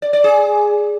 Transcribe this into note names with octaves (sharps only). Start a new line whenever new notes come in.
D5
D5
G#4